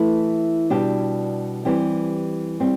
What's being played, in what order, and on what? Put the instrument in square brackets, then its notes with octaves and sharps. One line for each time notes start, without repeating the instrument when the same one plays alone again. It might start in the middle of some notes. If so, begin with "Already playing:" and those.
Already playing: [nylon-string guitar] E3 A3 E4
B2 G3 D4 G4
E3 G3 C4 G4
G3 C4